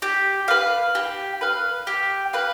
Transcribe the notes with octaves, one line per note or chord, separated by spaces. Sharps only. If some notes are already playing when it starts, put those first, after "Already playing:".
G4
B4 F5
G4
B4 F5
G4
B4 F5